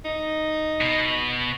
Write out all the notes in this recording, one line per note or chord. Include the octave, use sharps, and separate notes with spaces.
D#4
B2